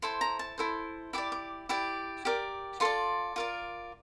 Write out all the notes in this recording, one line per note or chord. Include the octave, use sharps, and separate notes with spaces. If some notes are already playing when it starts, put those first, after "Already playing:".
E4 A4 C5 C6
A#5
A5
E4 A4 C5
E4 G4 D5 D6
D6
E4 G4 D5
G4 A#4 D5
F4 A4 D5 C6
F4 A#4 D5